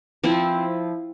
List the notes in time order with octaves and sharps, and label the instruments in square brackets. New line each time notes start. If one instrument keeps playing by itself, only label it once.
[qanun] F3 C4 E4